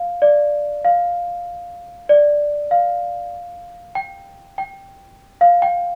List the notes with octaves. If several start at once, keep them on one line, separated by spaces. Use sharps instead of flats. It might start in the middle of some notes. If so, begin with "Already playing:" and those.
Already playing: F5
D5
F5
D5
F5
G5
G5
F5
G5